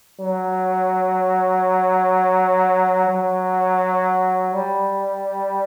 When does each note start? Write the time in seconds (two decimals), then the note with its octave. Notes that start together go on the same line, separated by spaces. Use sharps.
0.20 F#3
3.09 F#3
4.54 G3